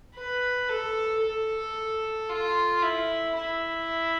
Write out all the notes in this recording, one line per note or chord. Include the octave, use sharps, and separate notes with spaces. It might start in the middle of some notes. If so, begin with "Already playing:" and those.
B4
A4
A4
F4
E4
E4